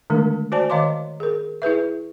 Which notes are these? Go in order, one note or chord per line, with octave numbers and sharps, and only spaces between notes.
D3 D#3 G#3 A3 D4
F#4 C5 D5 G#5 A5
D#3 C#5 D#5 F5 C6 D6
G#4 A#4
E4 G#4 B4 E5